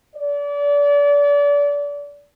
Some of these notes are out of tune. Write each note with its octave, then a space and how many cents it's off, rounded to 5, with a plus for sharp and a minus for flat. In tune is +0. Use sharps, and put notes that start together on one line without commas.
D5 -30